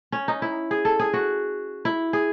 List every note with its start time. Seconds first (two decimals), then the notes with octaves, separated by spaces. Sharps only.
0.12 C#4
0.28 D#4
0.42 E4
0.71 G#4
0.85 A4
0.99 G#4
1.13 F#4
1.85 E4
2.13 G#4